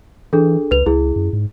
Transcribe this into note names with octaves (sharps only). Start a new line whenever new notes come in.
E3 D4 G#4 A4
C#2 B4 F7
C#2 E4 G#4
F#2
G#2